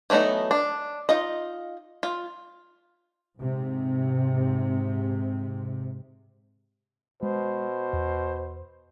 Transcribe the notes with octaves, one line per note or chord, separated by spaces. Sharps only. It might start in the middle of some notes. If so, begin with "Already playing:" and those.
E3 F#3 A3 B3 D#4
D4
D#4 F4 D#5
F4
G#2 C3
B2 G#3 C5
E2